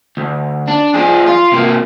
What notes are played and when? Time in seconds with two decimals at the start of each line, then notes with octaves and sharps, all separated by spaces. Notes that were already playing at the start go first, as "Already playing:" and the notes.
0.17 D2
0.67 D4
0.94 F3 G#4
1.26 F4
1.52 C3 A#3